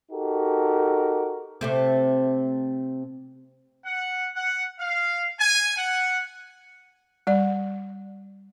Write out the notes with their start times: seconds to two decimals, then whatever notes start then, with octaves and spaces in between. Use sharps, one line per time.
0.11 D#4 F#4 G4 A4 A#4
1.61 C3 A3 C4
3.84 F#5
4.35 F#5
4.79 F5
5.38 G#5
5.76 F#5
7.27 G3 D5